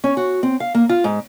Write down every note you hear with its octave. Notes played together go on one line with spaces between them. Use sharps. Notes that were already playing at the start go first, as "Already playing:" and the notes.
C#4
F#4
C4
F5
A#3
F4
G#2